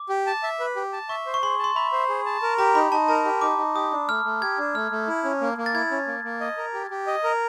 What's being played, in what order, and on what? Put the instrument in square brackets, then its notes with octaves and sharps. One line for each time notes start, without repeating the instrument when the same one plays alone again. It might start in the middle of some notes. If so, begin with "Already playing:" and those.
Already playing: [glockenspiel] D6
[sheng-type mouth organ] G4
A5
E5
B4
G4
A5
[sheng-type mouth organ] E5 [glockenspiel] C#6
[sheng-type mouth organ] C5
[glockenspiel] C#6
[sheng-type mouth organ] G#4 [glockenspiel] C6
[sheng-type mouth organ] A5
[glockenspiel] C6
[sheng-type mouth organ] E5 [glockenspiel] B5
[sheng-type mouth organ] C5
G#4
A5
A#4
[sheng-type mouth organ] G4 [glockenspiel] A#5
[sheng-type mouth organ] D#4 [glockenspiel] B5
[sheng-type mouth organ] D#4 [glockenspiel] A5
[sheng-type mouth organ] A#4 [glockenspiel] A5
[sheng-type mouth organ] G4
[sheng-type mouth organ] D#4 [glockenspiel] D6
[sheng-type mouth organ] D#4
[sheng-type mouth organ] G4 [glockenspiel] D#6
[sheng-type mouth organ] D4
[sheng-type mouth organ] A3 [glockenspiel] F6
[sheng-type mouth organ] A3
[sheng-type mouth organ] G4 [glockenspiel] G#6
[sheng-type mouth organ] D4
[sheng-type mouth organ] A3 [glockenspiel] F6
[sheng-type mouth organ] A3
E4
C#4
A#3
A#3
[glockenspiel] A6
[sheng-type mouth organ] E4 [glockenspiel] G#6
[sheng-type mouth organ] C#4
A#3
A#3
D#5
A#4
G4
G4
D#5
A#4